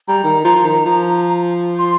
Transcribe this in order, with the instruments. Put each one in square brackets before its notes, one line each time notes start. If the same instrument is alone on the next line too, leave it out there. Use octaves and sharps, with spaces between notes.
[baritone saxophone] G3 [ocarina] A#5
[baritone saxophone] D#3
F3
F3
D#3
F3
[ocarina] C6